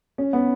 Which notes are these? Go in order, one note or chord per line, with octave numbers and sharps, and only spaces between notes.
C#4
B3